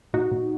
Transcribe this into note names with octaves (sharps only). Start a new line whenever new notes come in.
A#2 D#4 F#4
A#2